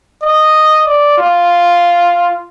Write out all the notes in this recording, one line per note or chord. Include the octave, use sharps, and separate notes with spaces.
D#5
D5
F4